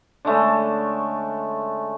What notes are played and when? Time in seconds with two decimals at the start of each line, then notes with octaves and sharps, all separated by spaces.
0.25 D3 G#3 A3 C#4